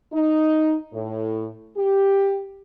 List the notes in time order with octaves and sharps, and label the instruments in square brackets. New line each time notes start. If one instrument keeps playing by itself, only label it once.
[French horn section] D#4
A2
G4